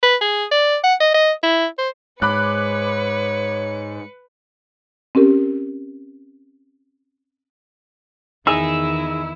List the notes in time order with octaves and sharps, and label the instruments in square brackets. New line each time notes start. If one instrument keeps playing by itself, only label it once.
[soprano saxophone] B4
G#4
D5
F#5
D#5
D#5
E4
C5
[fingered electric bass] G#2 [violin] B4 C#7 [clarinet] C#5 [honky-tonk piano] B5 D6 F#6
[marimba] C4 C#4 G4 A#4
[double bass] E2 D#3 [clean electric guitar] D#4 G#4 [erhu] E4 [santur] E6